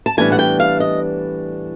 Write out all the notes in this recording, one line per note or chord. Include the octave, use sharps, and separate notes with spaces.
A5
A2 E3 G3 B3 D4 G#5
F#5
G5
F5
D#5